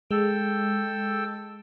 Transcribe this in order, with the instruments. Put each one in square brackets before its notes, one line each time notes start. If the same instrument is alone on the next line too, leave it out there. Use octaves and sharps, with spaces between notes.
[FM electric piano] G#3 [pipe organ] A4 G5 E6